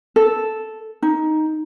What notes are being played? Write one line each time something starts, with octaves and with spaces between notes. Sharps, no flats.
A4
D#4